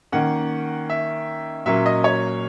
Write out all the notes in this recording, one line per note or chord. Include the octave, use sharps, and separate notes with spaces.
D#3 A#3 C#4 F#5
E5
A#2 F#3 A#3 C#4 E5
D#5
C#5